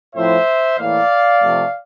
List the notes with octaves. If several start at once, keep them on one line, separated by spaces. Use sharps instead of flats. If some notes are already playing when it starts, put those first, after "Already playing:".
A2 F3 C4 E4 C5 E5
A2 E3 A#3 D5 F5
C3 F3 A3